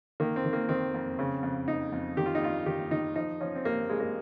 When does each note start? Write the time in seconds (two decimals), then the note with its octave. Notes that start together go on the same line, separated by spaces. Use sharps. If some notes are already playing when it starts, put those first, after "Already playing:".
0.20 D#3 A#3
0.36 C4
0.45 D#3
0.53 A#3
0.69 D#3 C4
0.94 F2
1.19 C#3
1.43 F2
1.68 F2 D#4
1.92 F2
2.17 D#3 G4
2.26 F4
2.35 D#4
2.42 G2 F4
2.66 D#3 G4
2.91 D#3 D#4
3.16 F3 D#4
3.41 F3 C#4
3.55 C4
3.65 G2 A#3
3.89 G2 G#3
4.00 A#3